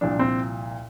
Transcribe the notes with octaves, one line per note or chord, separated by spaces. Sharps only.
C2 A#2 F3 D4
C4